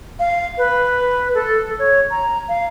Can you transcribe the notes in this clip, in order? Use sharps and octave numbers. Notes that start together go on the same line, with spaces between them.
F5
B4
A4
C#5
A#5
F5